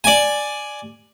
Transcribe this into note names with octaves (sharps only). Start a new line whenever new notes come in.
D5 G#5